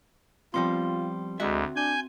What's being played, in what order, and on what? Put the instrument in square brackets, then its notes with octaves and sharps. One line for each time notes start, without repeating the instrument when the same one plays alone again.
[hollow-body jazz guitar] F3 G3 B3 [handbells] C4 C6 [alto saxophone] F4
[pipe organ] D2 [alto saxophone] G#3 [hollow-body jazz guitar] F#4 E5
[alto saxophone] D4 [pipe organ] G#5 G6